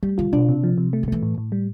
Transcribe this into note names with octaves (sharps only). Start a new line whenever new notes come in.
G3 A3
D3 F4
B2 D4
C3
F3
C3
A3
C3
E3 A3
A2
A2
G3